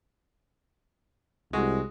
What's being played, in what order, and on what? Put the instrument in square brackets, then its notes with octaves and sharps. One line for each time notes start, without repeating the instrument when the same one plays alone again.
[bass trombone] C2 [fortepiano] G#3 F#4